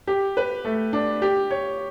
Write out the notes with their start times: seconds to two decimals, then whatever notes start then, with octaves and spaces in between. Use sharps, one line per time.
0.07 G4
0.37 B4
0.65 A3
0.93 D4
1.22 G4
1.51 C#5